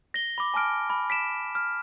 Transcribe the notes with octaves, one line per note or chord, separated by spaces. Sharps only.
A#6 G7
B5 D6
G#5 A5 D6 F6 D7
B5
B6 D7 E7
F6